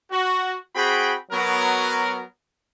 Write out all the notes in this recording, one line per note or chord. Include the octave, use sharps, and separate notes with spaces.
F#4
C4 F#4 G#4 G5 B5
F#3 B3 A#4